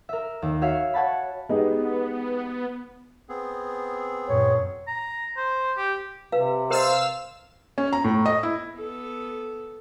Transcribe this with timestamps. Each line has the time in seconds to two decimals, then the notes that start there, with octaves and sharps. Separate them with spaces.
0.09 A#4 E5
0.42 D#2
0.62 F#4 C#5 E5 F5
0.93 C#5 F#5 A5 B5
1.49 G#3 B3 D#4 G4
3.29 B3 C4 G#4
4.29 F#2 A#2 C#5
4.88 A#5
5.37 C5
5.77 G4
6.32 C3 B4 F5
6.70 A#4 C5 D#5 F5 E6 E7
7.78 C#4
7.93 A#5
8.04 A2
8.26 D#5
8.43 E4
8.74 B3 A4